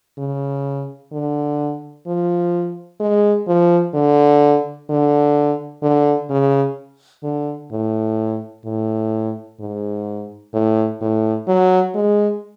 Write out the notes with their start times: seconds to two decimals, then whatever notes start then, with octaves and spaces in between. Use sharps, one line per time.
0.18 C#3
1.12 D3
2.06 F3
3.00 G#3
3.47 F3
3.94 D3
4.89 D3
5.82 D3
6.30 C#3
7.23 D3
7.72 A2
8.65 A2
9.60 G#2
10.54 A2
11.01 A2
11.48 F#3
11.95 G#3